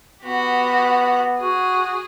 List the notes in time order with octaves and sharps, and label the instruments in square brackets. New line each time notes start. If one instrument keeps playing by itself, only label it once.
[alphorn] B3 [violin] F#4 G4
[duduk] F#4 [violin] G#4